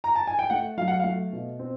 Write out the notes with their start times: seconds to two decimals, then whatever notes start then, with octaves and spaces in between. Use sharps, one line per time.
0.04 A#5
0.16 A5
0.27 G#5
0.39 G5
0.50 A3 F#5
0.78 F#3 F5
0.88 F#5
1.00 A3 F5
1.33 B2
1.59 C4